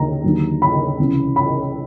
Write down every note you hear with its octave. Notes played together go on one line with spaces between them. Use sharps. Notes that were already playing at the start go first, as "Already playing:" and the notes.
Already playing: D#2 D3 A#5
D#2 D3 F#3
B5
C#2 C3 E3
B5